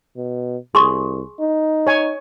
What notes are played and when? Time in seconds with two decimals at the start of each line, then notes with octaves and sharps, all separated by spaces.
0.16 B2
0.75 C2 G#4 C6 C#6
1.40 D#4
1.87 C#5 G#5